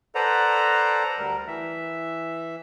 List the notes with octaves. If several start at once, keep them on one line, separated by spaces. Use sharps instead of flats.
A4 B4 C5 D5 F#5 A#5
D2 G3 A#4
E3 E5